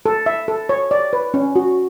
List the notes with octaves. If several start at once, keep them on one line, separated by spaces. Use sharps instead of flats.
A4
E5
A4
C#5
D5
B4
C#4
F#4